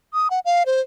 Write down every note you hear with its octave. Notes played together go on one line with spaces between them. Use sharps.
D#6
F#5
F5
C5